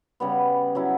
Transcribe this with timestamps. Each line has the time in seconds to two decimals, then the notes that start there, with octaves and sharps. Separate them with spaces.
0.20 C#3 G3 B3
0.75 F#3 C#4 E4